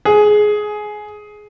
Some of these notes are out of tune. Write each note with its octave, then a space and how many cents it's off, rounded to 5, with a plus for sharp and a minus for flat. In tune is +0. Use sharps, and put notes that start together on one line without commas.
G#4 +15